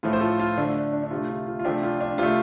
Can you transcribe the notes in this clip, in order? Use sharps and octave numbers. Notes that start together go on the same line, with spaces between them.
A2 F3 A3 F4
C5
F4 A4
F4
D3 A3 D4
D4
D4
D4
C3 A3 F4
F4
F4
F4
C3 F3 A3 D4 G4
F4
D4
C3 A3 F4